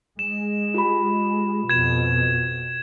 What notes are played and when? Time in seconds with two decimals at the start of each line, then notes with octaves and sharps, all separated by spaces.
0.19 G#3 E7
0.74 F4 G4 B5
1.69 F2 B2 G#6 E7